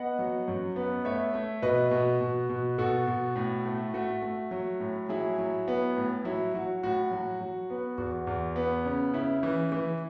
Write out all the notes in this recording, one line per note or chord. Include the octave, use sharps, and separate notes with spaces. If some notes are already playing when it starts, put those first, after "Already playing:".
Already playing: B3 D#5 F#5
F#3
F#2
B3
A3 C#5 E5
A3
B2 B4 D#5
B2
B2
B2
B2 F#4 A4
B2
A2
A3
A3 F#4
A3
F#3
A2
F#3 E4 G#4
F#3
B3
A2
F#3 E4
F#3 F#4
A2 F#4
F#3
F#3
B3
E2 F#4
E2
B3
C#3
C#3 E4
E3
E3